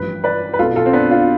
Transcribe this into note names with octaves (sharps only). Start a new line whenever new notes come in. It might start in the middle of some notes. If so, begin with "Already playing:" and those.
Already playing: A1 G2 F3 B4
B4 D5
B4
B1 B2 F4 A4
F4 A4
C4
B3 D4
D4 F4